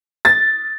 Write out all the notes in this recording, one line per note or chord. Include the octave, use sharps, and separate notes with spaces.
A6